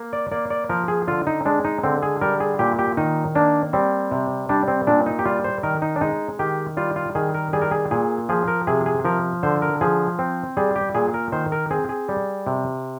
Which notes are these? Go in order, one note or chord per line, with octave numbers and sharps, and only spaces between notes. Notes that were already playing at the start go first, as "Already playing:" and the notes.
Already playing: A#3
D5
A#3 D5
D5
F3 A#4
G#4
D3 F4
D#4
G#3 D4
D#4
D3 C4
G#4
G3 A#4
G#4
A#2 G4
G4
D#3 D#4
A#3 D4
G3 C4
C3
G3 D4
C4
A#2 D4
D#4
G4
G3 F4
C5
D#3 A#4
D#4
D4
G#3 D#4
D#3 G4
G3 F4
F4
D#3 G#4
A#4
G3 G#4
A#4
G#4
A#2 G#4
F3 G#4
A#4
C3 G#4
G#4
F3 A#4
D3 C5
A#4
F3 G#4
C4
G3 G#4
G4
A#2 G#4
A#4
D#3 C5
A#4
C4 G#4
G#4
G3
C3